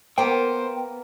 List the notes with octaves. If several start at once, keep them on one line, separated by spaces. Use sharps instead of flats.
A#3 B3 C5 G5